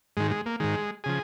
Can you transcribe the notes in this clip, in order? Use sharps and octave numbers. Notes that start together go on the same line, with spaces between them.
G#2 D#3 G#3
G#3
A#3
G#2 D#3 G#3
C#3 F3 G#4